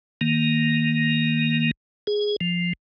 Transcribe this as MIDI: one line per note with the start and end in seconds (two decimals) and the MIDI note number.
0.21 1.71 51
0.21 1.71 58
2.07 2.36 68
2.41 2.73 53